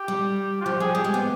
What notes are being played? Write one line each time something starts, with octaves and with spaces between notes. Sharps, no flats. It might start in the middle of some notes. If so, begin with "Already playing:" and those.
Already playing: G4
G3
F4
F3 G4
F3 G#4
G3 G4
G#3
B3